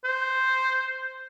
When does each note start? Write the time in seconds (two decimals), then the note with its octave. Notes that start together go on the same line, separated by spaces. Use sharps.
0.05 C5